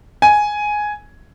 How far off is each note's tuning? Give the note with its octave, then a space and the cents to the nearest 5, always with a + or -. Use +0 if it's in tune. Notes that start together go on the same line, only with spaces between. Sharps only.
G#5 +5